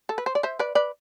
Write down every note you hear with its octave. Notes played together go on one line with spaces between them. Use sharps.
A4
B4
C5
D5
C5 E5
B4 D5
B4 D5